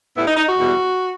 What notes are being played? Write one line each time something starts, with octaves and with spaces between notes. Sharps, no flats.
A2 G3 B3 E4
D#4
D#4
F#4
E2 B2 G3